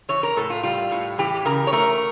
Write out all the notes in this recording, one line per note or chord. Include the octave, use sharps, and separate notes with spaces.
E3 C#5
A#4
A2 A4
F4
G3 F4
A2
E3 G4
C#3 A#4
C#5
A3 A#4